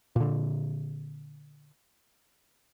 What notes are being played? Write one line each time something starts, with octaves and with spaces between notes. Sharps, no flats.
A#2 D3